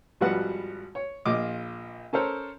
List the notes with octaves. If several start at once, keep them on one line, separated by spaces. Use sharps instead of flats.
G#1 F3 G3 F#4 B4 F#5
C#5
A#1 F4 D#5 D6
C#4 A4 A#4 C5 C#5